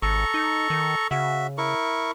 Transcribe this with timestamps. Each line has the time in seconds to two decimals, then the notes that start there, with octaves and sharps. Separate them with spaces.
0.02 G#1 A4 A#5 C#6
0.34 D#4
0.70 D#3
1.11 C#3 F#4 E5
1.58 E4 A#4 C#6